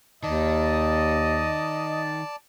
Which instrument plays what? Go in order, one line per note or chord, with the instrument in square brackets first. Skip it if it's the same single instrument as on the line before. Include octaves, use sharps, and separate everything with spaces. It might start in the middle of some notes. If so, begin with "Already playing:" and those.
[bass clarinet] D#2 [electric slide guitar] D#3 [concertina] D5 A5 [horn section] D#5